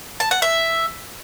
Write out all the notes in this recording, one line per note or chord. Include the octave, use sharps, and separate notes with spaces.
A5
F#5
E5